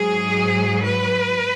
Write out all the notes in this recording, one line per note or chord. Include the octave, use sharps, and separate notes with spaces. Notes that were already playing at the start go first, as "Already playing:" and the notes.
Already playing: G#2 F#3 G#4
B4